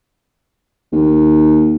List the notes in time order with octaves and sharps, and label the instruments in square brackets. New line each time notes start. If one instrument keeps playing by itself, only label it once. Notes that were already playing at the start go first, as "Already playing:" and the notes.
[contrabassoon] D#2